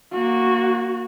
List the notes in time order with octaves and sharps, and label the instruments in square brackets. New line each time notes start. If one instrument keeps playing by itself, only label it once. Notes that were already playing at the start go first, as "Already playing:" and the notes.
[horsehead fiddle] A#3 F#4